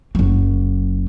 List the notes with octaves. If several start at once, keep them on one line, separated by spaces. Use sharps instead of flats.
F#1 F#3